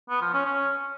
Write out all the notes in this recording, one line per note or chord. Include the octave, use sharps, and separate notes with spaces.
B3
F3
C#4
C#4